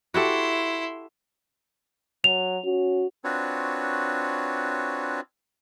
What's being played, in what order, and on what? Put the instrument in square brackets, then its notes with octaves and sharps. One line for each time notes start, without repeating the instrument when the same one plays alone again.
[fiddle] E4 C6 [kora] F#4 G4 A4
[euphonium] F#3 [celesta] F7
[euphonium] C#4 [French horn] F#4
[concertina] C4 D4 F4 F#4 B4 C#5